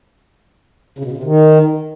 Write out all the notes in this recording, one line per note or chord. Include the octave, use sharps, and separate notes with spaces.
C#3
B2
C#3
C3
D#3